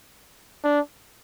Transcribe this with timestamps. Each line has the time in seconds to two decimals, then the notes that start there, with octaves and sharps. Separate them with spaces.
0.64 D4